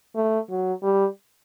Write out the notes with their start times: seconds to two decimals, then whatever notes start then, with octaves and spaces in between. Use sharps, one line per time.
0.15 A3
0.49 F#3
0.83 G3